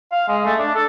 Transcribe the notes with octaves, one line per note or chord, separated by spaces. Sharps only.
F5
G#3
A3
D4
A4